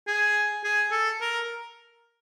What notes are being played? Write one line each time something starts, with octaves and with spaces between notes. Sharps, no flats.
G#4
G#4
A4
A#4